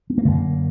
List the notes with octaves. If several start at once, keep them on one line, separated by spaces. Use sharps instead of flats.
B3
A#3
F#2 D3 A3 A#3